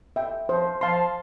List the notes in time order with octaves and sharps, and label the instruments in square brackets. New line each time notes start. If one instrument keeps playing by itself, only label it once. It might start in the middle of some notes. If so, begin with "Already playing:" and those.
[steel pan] E5 G5
[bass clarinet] F3 [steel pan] C5
[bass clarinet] F3 [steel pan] F5 A5 C6